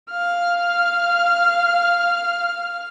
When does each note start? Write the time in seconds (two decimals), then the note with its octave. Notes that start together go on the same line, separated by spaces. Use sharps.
0.10 F5 F6